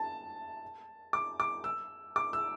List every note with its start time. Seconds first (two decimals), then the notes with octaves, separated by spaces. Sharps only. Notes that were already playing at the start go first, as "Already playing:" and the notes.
Already playing: A5
1.13 D6
1.40 D6
1.64 E6
2.16 D6
2.33 E6